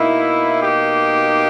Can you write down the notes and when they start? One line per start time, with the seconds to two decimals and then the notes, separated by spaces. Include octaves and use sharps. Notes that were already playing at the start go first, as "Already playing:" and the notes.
Already playing: B2 A#3 D#4 E4
0.61 G4